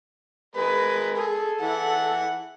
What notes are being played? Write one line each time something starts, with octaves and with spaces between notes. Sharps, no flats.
G#3 A#4 B4
G#4 A4
E3 F#5